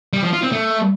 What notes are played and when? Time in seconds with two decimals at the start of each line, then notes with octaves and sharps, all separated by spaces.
0.13 G3
0.23 F3
0.33 F4
0.43 C4
0.52 A3